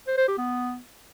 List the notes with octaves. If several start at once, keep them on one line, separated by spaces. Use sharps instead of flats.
C5
C5
G4
B3